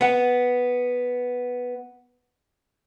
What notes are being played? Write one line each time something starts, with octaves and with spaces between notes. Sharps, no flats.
B3 F#5